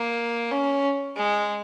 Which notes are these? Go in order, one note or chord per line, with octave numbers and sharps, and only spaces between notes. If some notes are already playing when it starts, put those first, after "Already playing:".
Already playing: A#3
C#4
G#3